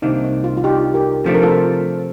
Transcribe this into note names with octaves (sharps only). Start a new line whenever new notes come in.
C2 C3 D#3 A#3 D4 D#4
D#4
F4
F4
D#4 G4
G4 A#4
C3 F3 A3 D4 A4
A#4
F4 A4